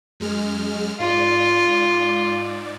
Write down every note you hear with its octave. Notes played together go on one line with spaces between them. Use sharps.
F#2 G#3 F6
G#2 F4 D5